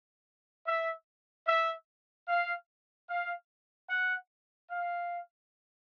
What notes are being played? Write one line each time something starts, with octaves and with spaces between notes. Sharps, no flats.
E5
E5
F5
F5
F#5
F5